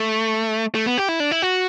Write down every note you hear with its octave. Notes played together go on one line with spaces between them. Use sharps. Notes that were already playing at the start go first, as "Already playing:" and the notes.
Already playing: A3
A3
B3
G4
E4
D4
E4
F#4